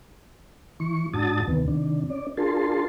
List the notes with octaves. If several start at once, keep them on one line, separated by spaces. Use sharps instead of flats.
E3 C#6
G#2 D4 F#4 A5 D#6 A6
D2 C3 D#3 B3
C3 D#3 D4
C#4 D5
D4 F4 G#4 A#4 A5 C6